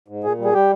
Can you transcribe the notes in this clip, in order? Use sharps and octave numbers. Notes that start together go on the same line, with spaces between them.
G#2
A#2 G#4
G3
G#4
G3 G4